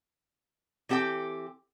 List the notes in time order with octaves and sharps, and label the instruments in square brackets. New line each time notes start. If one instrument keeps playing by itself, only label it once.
[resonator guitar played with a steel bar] E3 C4 G4 A4 G5